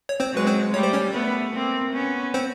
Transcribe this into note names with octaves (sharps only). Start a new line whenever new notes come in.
C#5
C4 C5
F#3 G#3 B4
C4 C5
G3 A3 C#5
C5
C#4 C#5
A3 B3
A#3 C4
B3 C#4
C4 C5